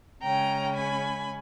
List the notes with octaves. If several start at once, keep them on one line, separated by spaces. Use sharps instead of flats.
C#3 G#3 C#4 G5 A#5
G#5 B5